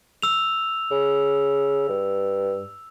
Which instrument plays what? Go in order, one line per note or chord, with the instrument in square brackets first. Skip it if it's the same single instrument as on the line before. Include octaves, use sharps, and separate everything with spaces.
[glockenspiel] E6 F7
[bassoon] C#3
G2